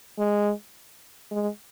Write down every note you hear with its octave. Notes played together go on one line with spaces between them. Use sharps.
G#3
G#3